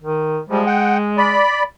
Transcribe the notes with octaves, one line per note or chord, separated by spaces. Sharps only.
D#3
F3 G3 G#3
F#5 G5
D5 B5